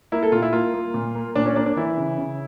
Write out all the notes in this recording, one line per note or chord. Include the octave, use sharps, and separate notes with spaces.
A#3 E4
A4
A#2 F4
E4
A#3 F4
A#3
A#2
A#3
A#2 D4
C#4
A#3 D4
D4
E3 E4
C#3
C#3